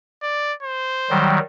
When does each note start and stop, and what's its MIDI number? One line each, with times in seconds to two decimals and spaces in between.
0.23 0.53 74
0.63 1.31 72
1.10 1.39 51
1.10 1.39 54
1.10 1.39 55